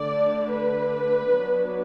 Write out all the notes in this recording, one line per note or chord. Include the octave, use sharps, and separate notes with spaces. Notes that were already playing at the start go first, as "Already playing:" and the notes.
Already playing: D3 A3 D4 D5
B4
F#3 B3 D4